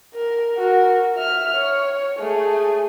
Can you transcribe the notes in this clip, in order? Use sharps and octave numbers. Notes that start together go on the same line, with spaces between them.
A#4
F#4 A#4
E5 F6
C#5
A3 G#4